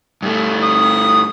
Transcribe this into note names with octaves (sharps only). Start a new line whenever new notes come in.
G2 A3
D#6